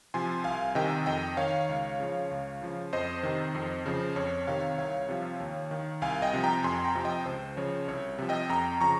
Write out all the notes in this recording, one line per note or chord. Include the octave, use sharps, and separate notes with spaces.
C3 F3 G#5 C6
C2 F5 G#5
C3 D#3 D#5 G5
F2 D#5 G5
D#3 C#5 F5
C#2
C#3 F3
C#2
C#3 F3
F2 C5 D#5
C3 D#3
F2
C#3 F3
F2 C#5
C3 D#3 C#5 F5
C2 C#5 F5
C3 F3
D#2
D#3
C2 F5 G#5
D#5 G5
C3 F3
G5 A#5
F2 G#5 C6
G5 A#5
C3 F3
D#5 G5
C#2 C5
C#3 F3 C#5
C2 C#5
C3 F3
D#5 G5
F2 G5 A#5
C#3 F3 A#5 C#6